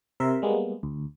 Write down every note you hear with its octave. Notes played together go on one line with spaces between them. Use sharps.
C3 A#4 E5 C6
G3 G#3 A#3 B3
D2